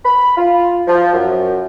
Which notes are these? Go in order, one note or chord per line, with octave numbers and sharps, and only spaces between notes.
B5
F4
F3
F#2